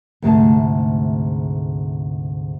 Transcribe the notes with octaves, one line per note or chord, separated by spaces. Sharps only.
D2 G#2 C3 A3 G#4 A5